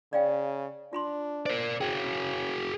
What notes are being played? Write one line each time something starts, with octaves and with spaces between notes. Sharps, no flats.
C#3 D5 F5 G5
D4 F4 B5 C6
A#4 C5 D5
C#3 F#4 G#4 G5